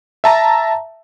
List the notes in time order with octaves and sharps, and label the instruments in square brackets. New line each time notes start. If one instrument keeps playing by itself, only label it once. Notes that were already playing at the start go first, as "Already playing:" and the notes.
[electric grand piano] E5 A5 A#5